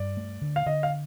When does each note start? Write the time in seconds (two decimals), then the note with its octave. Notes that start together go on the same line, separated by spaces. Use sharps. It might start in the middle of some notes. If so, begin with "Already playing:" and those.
Already playing: G2 D5
0.17 A3
0.41 D3
0.56 F5
0.66 D3 D#5
0.83 F5